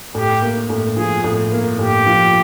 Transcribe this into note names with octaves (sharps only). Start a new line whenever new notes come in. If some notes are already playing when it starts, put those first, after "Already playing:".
A2 G4
A#3
A2
F3 G#4
A2
A#3
A2 G4
F3